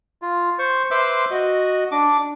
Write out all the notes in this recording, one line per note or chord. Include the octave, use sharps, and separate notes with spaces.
F4
C5 C#6
B4 C5 E5 C6 D6 E6
F#4 D#5
D4 D6